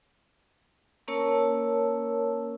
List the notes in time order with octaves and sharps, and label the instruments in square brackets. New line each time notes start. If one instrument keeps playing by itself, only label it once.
[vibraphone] A#3 C#4 A#4 C#5 A5 E6